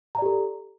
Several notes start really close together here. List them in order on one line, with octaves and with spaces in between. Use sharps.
A#5 D5 G4 A4